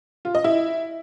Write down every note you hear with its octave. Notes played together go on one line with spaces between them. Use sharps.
F4
D#5
E4